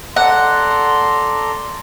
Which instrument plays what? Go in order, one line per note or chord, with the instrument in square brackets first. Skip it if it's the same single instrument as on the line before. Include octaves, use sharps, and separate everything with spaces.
[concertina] A4 D5 A#5 [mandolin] F#5 [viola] C6